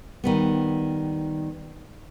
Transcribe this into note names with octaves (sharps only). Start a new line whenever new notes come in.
D#3 G3 B3